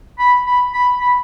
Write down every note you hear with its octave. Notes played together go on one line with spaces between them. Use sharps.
B5
B5
B5
B5